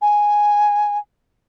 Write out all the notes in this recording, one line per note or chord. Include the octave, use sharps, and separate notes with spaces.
G#5